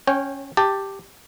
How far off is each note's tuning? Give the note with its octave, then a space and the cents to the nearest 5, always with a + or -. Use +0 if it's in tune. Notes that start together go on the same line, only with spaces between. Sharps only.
C#4 +0 C#5 -25 G5 +0
G4 +0 A5 +10